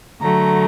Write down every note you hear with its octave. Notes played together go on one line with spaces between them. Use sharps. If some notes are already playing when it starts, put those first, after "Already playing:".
D3 F#3 A3 A#5